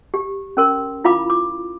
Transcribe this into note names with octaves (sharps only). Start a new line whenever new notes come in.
G4
C#4 A#4 C6
E4 F4 F5 B5 D6
D6